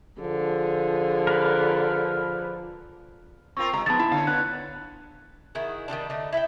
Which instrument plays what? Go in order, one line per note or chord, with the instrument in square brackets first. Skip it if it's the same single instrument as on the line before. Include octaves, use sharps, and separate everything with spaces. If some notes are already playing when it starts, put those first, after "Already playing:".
[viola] D3 G#4 [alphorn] F3
[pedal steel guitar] A#4 B4
[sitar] C4 F4 A#4 [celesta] C#6
[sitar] C3 [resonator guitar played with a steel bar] G#3 A#5
[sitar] G#2 [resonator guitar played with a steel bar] F3 B3 [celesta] A5 A6
[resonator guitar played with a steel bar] E4
[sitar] D3 C#4 [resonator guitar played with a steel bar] F5
[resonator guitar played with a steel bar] B3 [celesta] F#6
[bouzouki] D#3 E4 F#4 G#4
D#3 E3 G3 D4
D3 A3 D#4
E4 E5 F5 G5